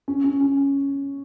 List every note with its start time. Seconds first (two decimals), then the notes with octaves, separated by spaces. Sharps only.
0.08 C#4
0.24 C#4
0.41 C#4